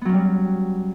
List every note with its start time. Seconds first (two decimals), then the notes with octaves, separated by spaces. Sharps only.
0.01 B3
0.05 F#3
0.09 C#4
0.13 G3